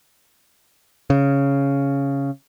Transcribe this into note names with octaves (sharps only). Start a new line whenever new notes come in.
C#3